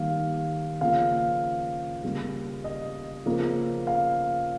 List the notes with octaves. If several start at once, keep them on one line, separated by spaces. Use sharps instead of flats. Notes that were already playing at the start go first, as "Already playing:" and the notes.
Already playing: D#3 G3 A#3 F5
C#3 F3 A#3 F5
C#3 G3 A#3
D#5
C#3 F3 A#3
F5